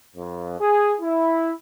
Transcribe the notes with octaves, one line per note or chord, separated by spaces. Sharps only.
F2
G#4
E4